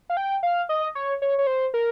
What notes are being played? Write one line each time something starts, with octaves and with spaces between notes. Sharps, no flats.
F5
G5
F5
D#5
C#5
C#5
C#5
C5
A#4